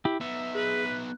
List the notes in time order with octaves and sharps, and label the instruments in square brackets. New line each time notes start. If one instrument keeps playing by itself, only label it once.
[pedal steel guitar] E4 G4
[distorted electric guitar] B3 D#4 [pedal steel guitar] E5
[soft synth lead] G#4 [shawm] B4
[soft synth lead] F#6